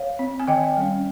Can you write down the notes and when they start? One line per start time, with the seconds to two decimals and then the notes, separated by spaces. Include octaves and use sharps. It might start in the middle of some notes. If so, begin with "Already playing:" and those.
Already playing: C#5 F5
0.19 C4
0.40 G#5
0.48 D#3 D#5 G5
0.77 G3 C#4